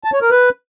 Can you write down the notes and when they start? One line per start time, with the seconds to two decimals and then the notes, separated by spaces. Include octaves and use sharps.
0.04 A5
0.13 C#5
0.22 A#4
0.31 B4